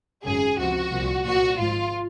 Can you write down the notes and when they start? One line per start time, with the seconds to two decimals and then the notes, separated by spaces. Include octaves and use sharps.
0.24 G#1 F#2 C#3 G#4
0.58 C#2 C3 F3 F#4
0.91 C2 A#2 F3
1.25 C2 A#2 F3 F#4
1.58 G#1 G#2 F3 F4